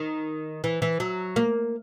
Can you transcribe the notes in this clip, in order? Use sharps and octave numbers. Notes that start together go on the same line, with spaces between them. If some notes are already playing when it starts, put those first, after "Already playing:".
Already playing: D#3
E3
E3
F#3
A#3